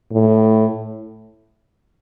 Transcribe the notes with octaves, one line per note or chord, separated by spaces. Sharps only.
A2